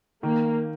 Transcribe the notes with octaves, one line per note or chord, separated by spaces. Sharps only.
D#3 A#3